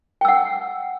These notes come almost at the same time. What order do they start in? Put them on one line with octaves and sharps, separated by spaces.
G5 E6 F#5